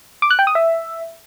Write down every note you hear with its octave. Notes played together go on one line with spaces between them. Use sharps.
D6
F#6
G5
D#6
E5